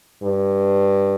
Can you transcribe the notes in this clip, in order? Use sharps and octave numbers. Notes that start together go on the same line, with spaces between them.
G2